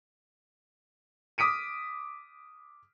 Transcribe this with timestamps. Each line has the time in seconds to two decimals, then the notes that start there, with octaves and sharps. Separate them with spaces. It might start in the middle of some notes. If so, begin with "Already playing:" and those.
1.38 D6 D#6 B6 D7 D#7